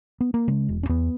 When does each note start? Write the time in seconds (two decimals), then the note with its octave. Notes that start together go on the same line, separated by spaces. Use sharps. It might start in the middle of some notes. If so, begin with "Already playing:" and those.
0.21 B3
0.34 A#3
0.48 C#3 G#3
0.68 E1
0.83 C#4
0.89 E2 B3